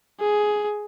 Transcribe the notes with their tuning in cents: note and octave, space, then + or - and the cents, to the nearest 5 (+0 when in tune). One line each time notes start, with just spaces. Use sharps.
G#4 +10